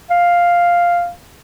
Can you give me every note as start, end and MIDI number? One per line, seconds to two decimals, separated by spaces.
0.10 1.10 77